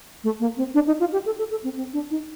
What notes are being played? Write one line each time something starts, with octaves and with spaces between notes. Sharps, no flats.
A3
A#3
C4
D4
D#4
F4
G4
A4
A4
A4
C4
C4
D4
D#4